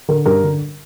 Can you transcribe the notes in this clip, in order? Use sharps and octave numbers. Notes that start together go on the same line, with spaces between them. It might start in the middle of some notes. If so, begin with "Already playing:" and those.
D3 A#4
G2 A#4
D3